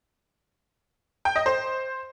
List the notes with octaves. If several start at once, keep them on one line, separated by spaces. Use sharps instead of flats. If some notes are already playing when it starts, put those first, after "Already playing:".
G5
D#5
C5